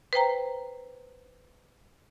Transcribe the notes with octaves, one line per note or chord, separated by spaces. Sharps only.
B4 C5 G5 A#5